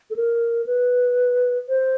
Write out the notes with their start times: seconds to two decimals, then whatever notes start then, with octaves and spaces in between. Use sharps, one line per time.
0.10 A4
0.16 A#4
0.66 B4
1.69 C5